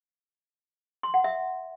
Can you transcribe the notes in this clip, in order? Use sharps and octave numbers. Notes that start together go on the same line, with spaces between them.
C6
F#5
E5